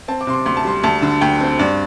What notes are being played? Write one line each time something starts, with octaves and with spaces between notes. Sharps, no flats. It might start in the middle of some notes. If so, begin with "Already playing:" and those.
C4 A5
D6
C3 C6
D6
D2 C6
A5
G3 C6
D2 A5
D3
D2 G5
C4
G2 D5